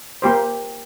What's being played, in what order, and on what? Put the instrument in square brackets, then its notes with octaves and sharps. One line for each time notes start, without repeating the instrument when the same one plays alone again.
[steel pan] A#3 G4 C5